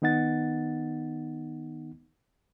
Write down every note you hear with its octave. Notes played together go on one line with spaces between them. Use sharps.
D#3 B3 D#4 F#5 A6